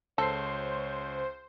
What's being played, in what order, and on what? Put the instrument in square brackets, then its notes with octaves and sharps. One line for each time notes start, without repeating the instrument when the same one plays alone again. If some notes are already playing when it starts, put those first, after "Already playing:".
[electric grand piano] C#2 C7 [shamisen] A4 [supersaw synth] C5 [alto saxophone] C#5